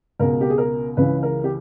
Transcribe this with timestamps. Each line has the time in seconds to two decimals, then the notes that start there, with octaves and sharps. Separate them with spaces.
0.20 C#2 B2 A#4
0.41 G4
0.50 G#4
0.58 A#4
0.97 C#2 C#3 E3 B4
1.23 A#4
1.44 G4